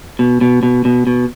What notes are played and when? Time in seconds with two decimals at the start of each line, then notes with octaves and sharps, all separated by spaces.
0.19 B2
0.41 B2
0.63 B2
0.85 B2
1.07 B2